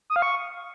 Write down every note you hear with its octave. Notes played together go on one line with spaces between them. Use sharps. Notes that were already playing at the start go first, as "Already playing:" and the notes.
D#6
F5
C#6